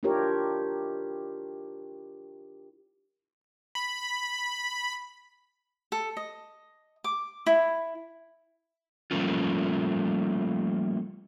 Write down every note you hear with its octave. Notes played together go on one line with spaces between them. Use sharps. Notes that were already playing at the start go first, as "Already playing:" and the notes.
D4 E4 F4 G4 A#4 C#5
B5
A4
D#5
D6
E4
F3 G3 A3 A#3 C#4 F4